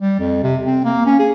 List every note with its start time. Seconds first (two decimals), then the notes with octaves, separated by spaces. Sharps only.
0.01 G3
0.20 F2
0.43 C3
0.66 C4
0.84 A#3
1.06 C#4
1.19 G#4